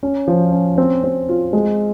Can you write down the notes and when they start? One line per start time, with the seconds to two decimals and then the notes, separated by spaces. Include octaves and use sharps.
0.03 C#4
0.28 F3
0.52 C#4
0.78 C4
1.03 C4
1.29 F4
1.53 G#3